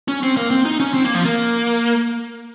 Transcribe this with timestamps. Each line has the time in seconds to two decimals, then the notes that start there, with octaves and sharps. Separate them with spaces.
0.08 C#4
0.23 C4
0.37 A#3
0.51 C4
0.65 D#4
0.80 C#4
0.94 C4
1.05 A#3
1.15 F3
1.25 A#3